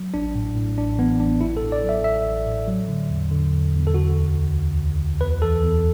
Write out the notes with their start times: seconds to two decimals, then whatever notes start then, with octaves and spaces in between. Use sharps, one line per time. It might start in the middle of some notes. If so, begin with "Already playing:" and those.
Already playing: F#3
0.14 A1 D4
0.35 A2
0.55 A2
0.78 A1 D4
0.98 E3 B3
1.20 A1 D4
1.40 A1 E4
1.57 A4
1.62 A2
1.72 D5
1.83 F#3
1.89 E5
2.04 A1 E5
2.26 A1
2.46 A2
2.68 F#3
2.88 D3
3.10 E2
3.31 D3
3.53 E2
3.74 E2
3.87 A4
3.94 D3 F#4
4.15 D2
4.37 D2
4.57 D2
4.79 D2
5.00 D2
5.21 E2 B4
5.42 E3 A4
5.63 E2